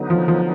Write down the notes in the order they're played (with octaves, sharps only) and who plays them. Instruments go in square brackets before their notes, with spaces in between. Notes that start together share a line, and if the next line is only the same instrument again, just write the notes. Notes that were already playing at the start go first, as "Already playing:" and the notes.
Already playing: [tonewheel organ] D3 F#3 B3 D#4
[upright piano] F3
F3